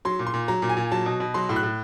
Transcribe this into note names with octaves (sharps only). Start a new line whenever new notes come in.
F#3 C6
A#2
C6
A#2
F#3 A#5
A#2
G#5
A#2
F#3 A5
B2
B2
F#3 C6
A2
F#6
A2